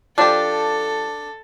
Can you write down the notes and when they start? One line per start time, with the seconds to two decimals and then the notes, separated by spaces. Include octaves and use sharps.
0.18 F3 D4 G4 A4